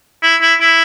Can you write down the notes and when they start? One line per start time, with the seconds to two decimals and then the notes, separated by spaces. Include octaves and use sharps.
0.22 E4
0.41 E4
0.60 E4